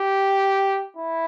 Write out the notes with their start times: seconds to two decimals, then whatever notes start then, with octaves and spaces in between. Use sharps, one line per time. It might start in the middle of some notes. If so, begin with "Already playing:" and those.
Already playing: G4
0.97 E4